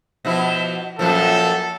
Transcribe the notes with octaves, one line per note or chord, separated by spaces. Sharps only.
B2 F3 E4
F#2 A#2 F3 A4